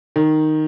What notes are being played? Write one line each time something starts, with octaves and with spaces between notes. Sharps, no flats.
D#3